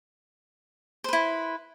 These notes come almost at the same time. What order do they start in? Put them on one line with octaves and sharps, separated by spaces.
C5 B4 E4